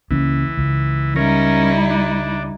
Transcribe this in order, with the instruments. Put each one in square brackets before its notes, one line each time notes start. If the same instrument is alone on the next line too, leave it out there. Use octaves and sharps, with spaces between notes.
[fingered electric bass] C#2 A#3 C#4 [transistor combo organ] E3
[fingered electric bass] C#2
[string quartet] G3 D#4 E4 [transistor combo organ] C#4 A#4
[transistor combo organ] D4